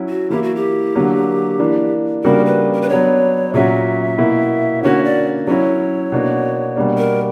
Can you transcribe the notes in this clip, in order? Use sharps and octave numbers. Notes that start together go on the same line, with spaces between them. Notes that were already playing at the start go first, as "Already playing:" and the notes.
Already playing: F#3 C#4 E4
F#4
E3 A#3 E4 G4
F#4
G4
D3 F#3 A#3
E3 A#3 D4
C#3 G3 A#3 D4 F#4 A#4
B4
A#4
B4
F#3 B3 D4 C#5
A#2 F#3 C#4 F#4 E5
B2 A#3 E4
D3 A#3 C#4 F#4 C#5
D5
F#3 C#4 E4 C#5
B2 A#3 D4 F#4
B2 G3 A#3 D4
A#4